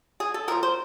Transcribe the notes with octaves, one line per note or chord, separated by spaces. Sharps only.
G#4
A4
F3 A3 D4 F4 A#4
C5